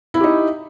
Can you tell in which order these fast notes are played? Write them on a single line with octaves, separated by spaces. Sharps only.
E4 E5 G4 D#4